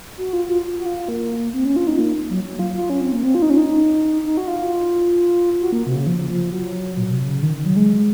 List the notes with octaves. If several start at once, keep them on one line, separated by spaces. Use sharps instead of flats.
F#4
F4
F4
F#4
F4
A#3
C4
C#4
F4
D#4
A#3
F#3
F#3
F4
F4
C#4
C4
A#3
C4
F4
D#4
C#4
D#4
D#4
F#4
F4
F#4
A#3
C3
C#3
F3
F3
F#3
A#2
A#2
C3
C#3
D#3
F#3
G#3